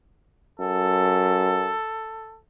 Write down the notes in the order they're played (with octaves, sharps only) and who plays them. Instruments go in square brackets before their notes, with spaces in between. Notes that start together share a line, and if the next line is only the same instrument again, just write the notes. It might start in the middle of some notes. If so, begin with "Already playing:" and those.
[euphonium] F#2 [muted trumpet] A4